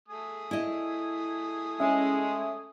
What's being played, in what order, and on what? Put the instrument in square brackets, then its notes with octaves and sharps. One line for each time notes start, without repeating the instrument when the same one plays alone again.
[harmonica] A3 G#5 D#6
[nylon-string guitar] E4 D#5
[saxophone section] G#3 [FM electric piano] C#4 E5